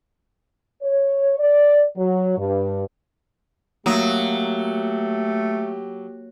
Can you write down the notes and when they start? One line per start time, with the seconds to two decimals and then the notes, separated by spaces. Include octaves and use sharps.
0.81 C#5
1.38 D5
1.96 F#3
2.37 G2
3.86 F#3 A3 A#3 F#4 G4 D#6